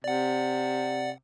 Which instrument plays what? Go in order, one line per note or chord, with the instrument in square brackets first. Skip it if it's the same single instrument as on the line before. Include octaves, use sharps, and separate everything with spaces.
[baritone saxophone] C3 [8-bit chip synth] D5 F#5